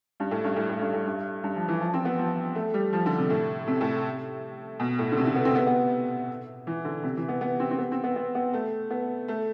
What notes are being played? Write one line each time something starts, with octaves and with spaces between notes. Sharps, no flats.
G2
A2
G2
A2
A2
G2
A2
G2
G2
F3
E3
F3
C4
B3
F3
A3
G3
F3
D3
C3
A2
C3
A2
B2
A2
D3
C3
D3
B3
C4
B3
B3
E3
D3
C3
E3
B3
B3
C4
C4
B3
C4
B3
B3
B3
A3
B3
A3